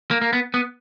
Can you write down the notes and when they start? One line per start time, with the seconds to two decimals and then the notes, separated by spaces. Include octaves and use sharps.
0.11 A#3
0.22 A#3
0.33 B3
0.54 B3